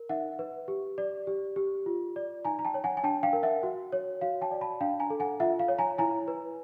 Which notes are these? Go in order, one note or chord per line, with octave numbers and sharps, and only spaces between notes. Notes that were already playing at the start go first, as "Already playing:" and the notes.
Already playing: A#4
D#4 E5 F#5
B4
G4
D5
G4
G4
F4
D5
D#4 G#5 A#5
A#5
G5 A5
C#5
F#5 G#5
G#5
D4 G5 A5
F5 G5
A#4
E5 F#5
F#4
C#5
F#4 F5
G5 A5
D5
A5 B5
D4 F5 G5
G#5 A#5
A4
F#5 G#5
F4 E5 F#5
F5
C#5
G#5 A#5
E4 G#5 A#5
B4